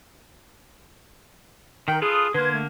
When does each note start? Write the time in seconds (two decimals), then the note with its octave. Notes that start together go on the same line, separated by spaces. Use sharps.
1.88 D#3 A#4 G5
2.02 F4 G#4 A4 B4 D#6
2.34 D3 A#3 B4 C6 G#6
2.54 A3